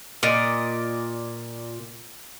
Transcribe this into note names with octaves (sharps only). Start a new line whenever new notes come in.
A#2 D5 D#5